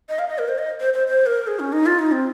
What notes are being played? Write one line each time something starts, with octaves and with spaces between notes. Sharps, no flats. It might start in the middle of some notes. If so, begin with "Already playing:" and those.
D#5
F5
D#5
A#4
C5
D#5
C5
C5
C5
A#4
G#4
C#4
D#4
F4
D#4
C4